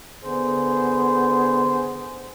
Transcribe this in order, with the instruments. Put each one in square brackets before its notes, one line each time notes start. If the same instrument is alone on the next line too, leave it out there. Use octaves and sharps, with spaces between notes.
[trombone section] D3 B3 G#4 C5